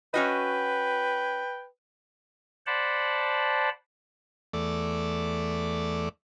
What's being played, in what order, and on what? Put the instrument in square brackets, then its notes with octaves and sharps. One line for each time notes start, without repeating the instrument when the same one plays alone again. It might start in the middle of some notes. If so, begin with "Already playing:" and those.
[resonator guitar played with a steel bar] C#4 F#4 D#5 [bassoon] B4 [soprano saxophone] G5
[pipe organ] C5 D5 F#5 A5 B5
[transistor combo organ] E2 A3 D5